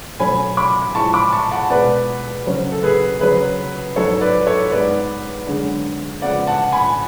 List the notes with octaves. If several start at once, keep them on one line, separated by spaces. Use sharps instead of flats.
B2 F#3 A3 C#4 G#5 B5
B5 D6
A2 F3 G#3 A5 C#6
B5 D6
A5 C#6
F#5 A5
B2 G#3 B3 B4 D5
C#3 F#3 C#4
A4
G#4 B4
F#2 C#3 F#3 G#4 B4
G#2 F#3 B3 A4 C#5
B4 D5
A4 C#5
G#2 G#3 B3 B4 D5
F#2 D3 G#3 B3
C#3 F3 G#3 B3 D5 F#5
F#5 A5
G#5 B5